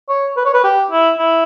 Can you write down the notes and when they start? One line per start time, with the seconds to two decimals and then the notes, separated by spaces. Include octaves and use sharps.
0.09 C#5
0.37 B4
0.45 C#5
0.54 B4
0.64 G4
0.91 E4
1.19 E4